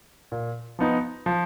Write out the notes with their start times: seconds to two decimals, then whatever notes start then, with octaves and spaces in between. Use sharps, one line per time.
0.32 A#2
0.79 F3 B3 D#4
1.26 F3